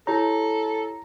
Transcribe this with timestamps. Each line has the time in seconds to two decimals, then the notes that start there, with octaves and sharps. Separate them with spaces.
0.07 E4 G4 A4 C#5 A#5